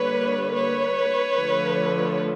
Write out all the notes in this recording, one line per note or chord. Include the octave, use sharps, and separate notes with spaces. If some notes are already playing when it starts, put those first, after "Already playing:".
Already playing: D3 G3 A#3 B4 C#5
B4 C#5
D3 F3 A3